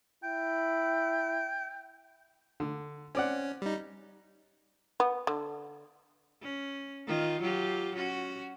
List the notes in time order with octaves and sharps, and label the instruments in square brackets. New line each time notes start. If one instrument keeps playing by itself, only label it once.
[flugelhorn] E4 [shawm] G5
[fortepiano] D3
[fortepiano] C4 D5 F#5 [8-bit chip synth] C#4
[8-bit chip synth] G3 D#4
[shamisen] B3
D3
[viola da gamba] C#4
D#3 F4
F#3 F4 G4
C#4 F#4